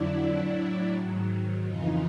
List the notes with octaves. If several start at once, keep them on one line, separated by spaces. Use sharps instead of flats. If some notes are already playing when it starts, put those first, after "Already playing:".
Already playing: F2 D3 F#3 D4 E4
A2 F#3
G#2 D#3 F#3
F2 C#3 E3 D#4 F4